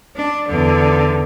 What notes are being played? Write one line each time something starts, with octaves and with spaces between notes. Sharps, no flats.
D4
E2 D3